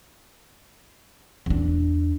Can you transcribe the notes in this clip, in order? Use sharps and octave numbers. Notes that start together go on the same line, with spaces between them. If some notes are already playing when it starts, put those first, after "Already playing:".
E2 D4